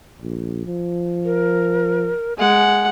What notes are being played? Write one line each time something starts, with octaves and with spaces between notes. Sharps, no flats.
A#1
F3
A#4
G#3 F#5 G#5